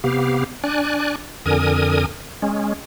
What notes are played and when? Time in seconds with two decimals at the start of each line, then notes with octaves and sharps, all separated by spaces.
0.04 C3 B3 G4 F5
0.64 D4 D5 G#5 F#6
1.46 F2 D3 A#4 G#5 D#6
2.42 G#3 C#4